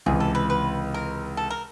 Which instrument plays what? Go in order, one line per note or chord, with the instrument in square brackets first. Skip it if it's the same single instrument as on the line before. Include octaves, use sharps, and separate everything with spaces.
[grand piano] C#2 C3 E3 [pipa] G#4
[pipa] A4
B4
B4
A#4
A4
A#4